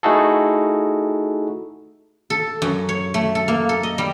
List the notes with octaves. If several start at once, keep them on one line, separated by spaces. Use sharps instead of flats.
A3 D#4 E4 F#4 G#4 A4
A4
F#2
C#5
A3
A4
A#3
A4
D#5
G3